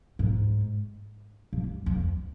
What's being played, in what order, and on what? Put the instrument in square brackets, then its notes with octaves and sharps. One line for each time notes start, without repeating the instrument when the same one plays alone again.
[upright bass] G#2
G2
F2